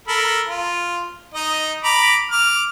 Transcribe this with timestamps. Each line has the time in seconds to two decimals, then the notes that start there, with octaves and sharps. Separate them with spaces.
0.08 A4 A#4 B5
0.48 F4
1.34 D#4 D#5
1.84 A#5 B5 D6
2.31 D6 F6